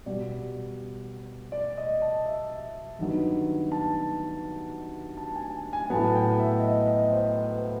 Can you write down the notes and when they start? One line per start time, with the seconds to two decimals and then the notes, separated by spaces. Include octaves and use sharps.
0.06 B2 G3 B3 D5
1.52 D5
1.78 D#5
2.02 A5
2.26 E5
2.99 G2 D#3 F#3 B3
3.72 A5
5.17 A5
5.35 G#5
5.73 G#5
5.90 A2 F#3 B3 A5
6.15 G5
6.40 E5
6.59 D#5
6.63 E5
6.87 D#5
7.12 C5
7.36 B4